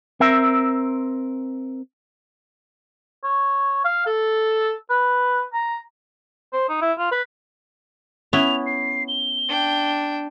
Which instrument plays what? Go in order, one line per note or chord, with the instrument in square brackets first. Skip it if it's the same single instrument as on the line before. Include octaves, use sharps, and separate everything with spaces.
[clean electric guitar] C4 A#4 E5
[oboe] C#5
F5
A4
B4
A#5
[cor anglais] C5
D#4
E4
F4
B4
[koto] B3 C#4 E4 [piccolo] F7
[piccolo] C7
G7
[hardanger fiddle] D4 G5